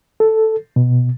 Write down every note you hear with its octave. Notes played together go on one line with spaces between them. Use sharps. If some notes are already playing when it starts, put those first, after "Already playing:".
A4
B2